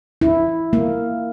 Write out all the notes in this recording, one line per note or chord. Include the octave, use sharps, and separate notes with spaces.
E4
A#3